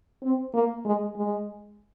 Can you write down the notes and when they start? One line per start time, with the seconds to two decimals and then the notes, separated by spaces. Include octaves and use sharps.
0.22 C4
0.54 A#3
0.85 G#3
1.16 G#3